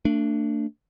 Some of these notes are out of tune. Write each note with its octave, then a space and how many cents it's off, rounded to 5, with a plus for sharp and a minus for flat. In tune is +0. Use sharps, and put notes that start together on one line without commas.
A3 +35 D4 +0